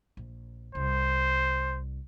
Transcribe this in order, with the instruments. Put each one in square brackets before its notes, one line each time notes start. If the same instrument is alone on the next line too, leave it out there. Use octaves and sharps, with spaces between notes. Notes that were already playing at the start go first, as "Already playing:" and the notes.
[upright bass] A#1
[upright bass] C2 [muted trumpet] C5